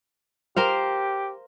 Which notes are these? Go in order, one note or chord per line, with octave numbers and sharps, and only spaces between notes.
G4 A#4 C5 F5